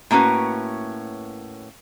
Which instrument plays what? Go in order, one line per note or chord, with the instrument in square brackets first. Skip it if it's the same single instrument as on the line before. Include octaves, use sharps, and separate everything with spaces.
[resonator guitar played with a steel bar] A2 A#3 C#4 F#4 B4